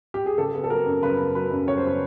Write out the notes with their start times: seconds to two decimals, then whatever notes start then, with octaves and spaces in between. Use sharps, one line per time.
0.14 G4
0.26 G#4
0.38 C#3 A4
0.55 B3
0.64 A4
0.70 F#3 A#4
0.86 F#2
1.03 C#3 B4
1.19 B3
1.35 F#3 B4
1.51 F#2
1.67 C#3 C#5
1.77 C5
1.84 B3 B4